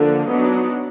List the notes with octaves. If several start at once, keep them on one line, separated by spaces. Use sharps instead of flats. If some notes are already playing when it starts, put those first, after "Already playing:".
Already playing: D3 F3 A#3 D4
F#3 B3 D4 D#4